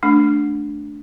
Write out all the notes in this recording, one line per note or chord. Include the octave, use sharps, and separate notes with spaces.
A3 D4